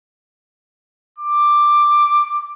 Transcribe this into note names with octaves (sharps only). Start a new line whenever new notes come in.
D6